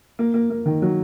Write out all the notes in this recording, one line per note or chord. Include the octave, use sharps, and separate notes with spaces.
A#3
A#3
A#3
D#3
F#3